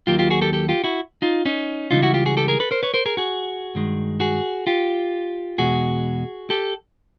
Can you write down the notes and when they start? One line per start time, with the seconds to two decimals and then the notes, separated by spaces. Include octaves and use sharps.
0.07 D#2 D#3 F#3 A#3 F4 G4
0.19 F4 G4
0.30 F#4 G#4
0.42 G4 A4
0.53 G4 A4
0.69 F4 G4
0.84 E4 F#4
1.22 D#4 F4
1.45 C#4 D#4
1.91 C#2 C#3 E3 G3 D#4 F4
2.02 E4 F#4
2.14 F4 G4
2.26 F#4 G#4
2.37 G4 A4
2.48 G#4 A#4
2.60 A4 B4
2.71 A#4 C5
2.83 B4 C#5
2.94 A#4 C5
3.06 G#4 A#4
3.17 F#4 G#4
3.75 G2 D#3 G#3
4.20 F#4 G#4
4.67 F4 G4
5.58 E2 B2 G#3 F#4 G#4
6.50 G4 A4